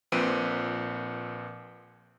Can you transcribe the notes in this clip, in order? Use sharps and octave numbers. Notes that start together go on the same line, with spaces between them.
A#1 A#2 C4 B4 D7 D#7